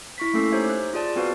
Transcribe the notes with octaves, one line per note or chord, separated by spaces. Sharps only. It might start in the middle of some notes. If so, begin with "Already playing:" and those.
E4 C#6 B6
A3 A#3 C#4 A4 E6 C7
D#4 G4 C5 C#5 E5
F#6
F4 G#4 D5 A5
B3 C4 F#4 B4 C5 F5